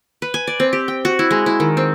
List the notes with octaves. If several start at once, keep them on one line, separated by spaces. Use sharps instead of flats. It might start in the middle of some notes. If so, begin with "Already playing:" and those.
B4
G#5
D5
C4
G4
G5
F#4
E4
G#3
E4
D#3
C4